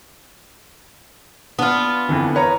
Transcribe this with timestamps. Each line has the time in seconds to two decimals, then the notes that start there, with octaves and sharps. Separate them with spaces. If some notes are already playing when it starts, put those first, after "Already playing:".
1.59 B3 D4 F4
2.09 F2 D3 E3
2.35 B4 C#5 A#5